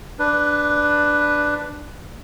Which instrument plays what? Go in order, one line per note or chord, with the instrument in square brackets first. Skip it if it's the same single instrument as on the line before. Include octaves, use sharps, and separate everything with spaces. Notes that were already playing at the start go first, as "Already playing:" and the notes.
[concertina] D4 B4